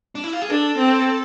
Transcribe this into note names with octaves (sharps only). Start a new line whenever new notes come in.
D4
E4
F4
G#4
D4 A4
C4